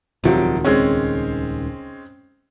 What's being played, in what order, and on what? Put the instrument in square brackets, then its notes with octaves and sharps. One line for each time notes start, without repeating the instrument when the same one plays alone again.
[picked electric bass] D#1 C#2 D#3 [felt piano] C3 F3 F#3
[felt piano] G#3 C4 C#4